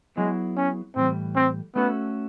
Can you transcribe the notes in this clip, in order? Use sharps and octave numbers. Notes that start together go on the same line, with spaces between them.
F#3 G#3 B3 E4 G#4
C#4
A2 E3 G3 C4
C4
A3 B3 C#4 F#4 A4